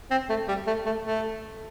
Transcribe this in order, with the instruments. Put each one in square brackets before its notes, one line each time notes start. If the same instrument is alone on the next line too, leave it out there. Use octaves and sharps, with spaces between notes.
[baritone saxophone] C4
A3
G3
A3
A3
A3